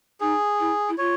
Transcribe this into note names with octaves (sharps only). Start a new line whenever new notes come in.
D#4 G#4
E4
E4
F4 C#5